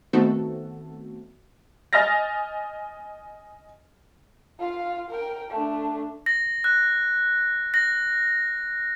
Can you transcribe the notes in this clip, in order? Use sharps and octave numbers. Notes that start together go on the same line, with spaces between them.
D#3 A3 B3 C4 F#4 A4
D#5 G#5 F6 A6 A#6
F4 F5
A#4 G5
A3 D4
A#6
F#6
A#6